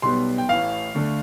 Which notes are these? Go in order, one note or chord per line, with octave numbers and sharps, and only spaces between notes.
B1 B2 G3 B3 C6
G5
A1 A2 E3 F5
D2 D3 A3